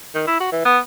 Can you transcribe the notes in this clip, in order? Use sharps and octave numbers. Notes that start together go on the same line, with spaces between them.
D#3
E4
F#4
E3
B3